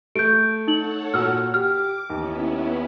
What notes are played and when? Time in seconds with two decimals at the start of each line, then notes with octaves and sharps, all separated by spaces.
0.15 A3 G6 D7
0.68 D#4 A4 C#5 F#5 F#7
1.14 A#2 F#4 E6 F6
1.54 G4 D6 F6
2.10 D#2 B3 C#4 E4